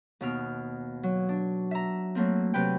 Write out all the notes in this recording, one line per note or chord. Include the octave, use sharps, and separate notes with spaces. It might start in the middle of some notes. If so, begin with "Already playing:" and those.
D#2 B2 F6
F#3
D4
E5 A#5
F#3 A3 A#3 C4
C3 F#3 B4 G5